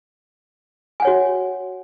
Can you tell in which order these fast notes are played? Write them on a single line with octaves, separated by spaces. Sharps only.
G#5 F#5 C#5 F#4